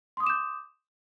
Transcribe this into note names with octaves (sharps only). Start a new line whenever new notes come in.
C6 D6 D#6 G6 E7